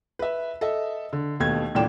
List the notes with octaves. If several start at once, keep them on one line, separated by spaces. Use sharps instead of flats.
B4 E5
A4 D#5 E5
D3
D#2 B2 A3 B3 G#6
D#1 A#2 E3 D4 G5 E7